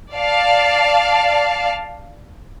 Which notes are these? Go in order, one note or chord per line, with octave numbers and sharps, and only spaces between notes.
D5 F5 A5